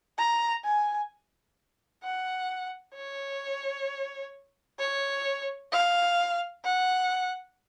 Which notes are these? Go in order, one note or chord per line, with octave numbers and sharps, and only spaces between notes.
A#5
G#5
F#5
C#5
C#5
F5
F#5